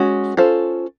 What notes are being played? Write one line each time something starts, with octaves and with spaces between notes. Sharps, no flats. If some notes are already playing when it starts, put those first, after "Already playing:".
Already playing: G#3 C#4 F#4
C#4 F4 A4 C5